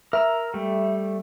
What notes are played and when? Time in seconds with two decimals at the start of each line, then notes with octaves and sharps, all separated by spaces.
0.13 A#4 E5 A#5 E6
0.54 G3 A3